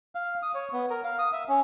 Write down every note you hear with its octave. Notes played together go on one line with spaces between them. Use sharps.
F5
D#6
C#5
B3
A#4
F5
D#6
E5
C#4